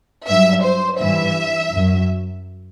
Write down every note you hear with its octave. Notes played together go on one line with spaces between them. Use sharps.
G2 F#3 E5
C5
G2 E3 E5
F#2 F#3